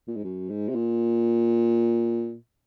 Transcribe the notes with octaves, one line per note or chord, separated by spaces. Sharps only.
A#2
G#2
F#2
G#2
C3
A#2